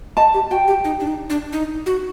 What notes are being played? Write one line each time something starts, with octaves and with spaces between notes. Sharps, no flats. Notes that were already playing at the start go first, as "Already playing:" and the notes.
D#5 A5
G4
F#4 G5
G4
D#4
D4
D#4
D4
D#4
F#4